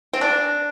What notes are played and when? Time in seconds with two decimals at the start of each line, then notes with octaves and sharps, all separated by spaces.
0.13 C4
0.21 D4